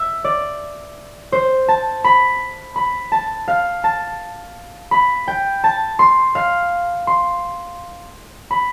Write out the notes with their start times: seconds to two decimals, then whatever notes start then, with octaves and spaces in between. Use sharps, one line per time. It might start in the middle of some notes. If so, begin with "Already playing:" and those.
Already playing: E5
0.24 D5
1.32 C5
1.68 A5
2.04 B5
2.76 B5
3.12 A5
3.48 F5
3.84 A5
4.91 B5
5.28 G5
5.64 A5
5.99 C6
6.35 F5
7.07 C6
8.51 B5